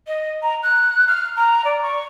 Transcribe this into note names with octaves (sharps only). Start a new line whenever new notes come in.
D#5
A#5
F#6
F6
A#5
D5
C#6